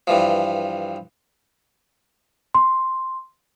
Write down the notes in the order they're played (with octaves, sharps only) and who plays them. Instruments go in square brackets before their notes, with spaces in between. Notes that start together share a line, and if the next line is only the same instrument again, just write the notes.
[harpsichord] G2 E3 F3
[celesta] C6